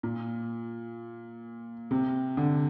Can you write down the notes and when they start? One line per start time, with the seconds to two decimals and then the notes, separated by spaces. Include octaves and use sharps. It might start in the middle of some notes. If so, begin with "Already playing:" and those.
0.03 A#2
1.91 C3
2.37 D3